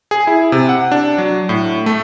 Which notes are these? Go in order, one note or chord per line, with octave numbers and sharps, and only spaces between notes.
G#4
E4
C3
F#5
D4
F#3
A2
A3